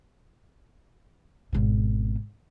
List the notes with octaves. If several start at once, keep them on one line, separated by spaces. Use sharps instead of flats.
G#1 B2